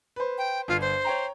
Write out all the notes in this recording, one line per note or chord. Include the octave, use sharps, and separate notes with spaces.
B4 C5
G5
G1 F4
C5
C#5 G5 A#5